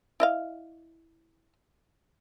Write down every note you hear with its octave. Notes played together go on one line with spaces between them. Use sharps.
E4 D#5 F5